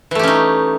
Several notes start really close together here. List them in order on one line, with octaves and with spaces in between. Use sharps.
E3 A3 G4 C#4 D#4